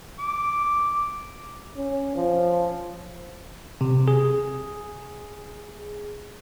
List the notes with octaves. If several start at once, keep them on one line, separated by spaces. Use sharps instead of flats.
D6
C#4
F3
C3
G#4